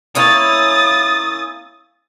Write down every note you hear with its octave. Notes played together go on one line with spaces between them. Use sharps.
A#3 C#4 E4 D#6 A6